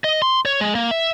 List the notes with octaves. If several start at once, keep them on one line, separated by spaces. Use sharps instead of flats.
D#5
C6
C#5
G#3
A#3
E5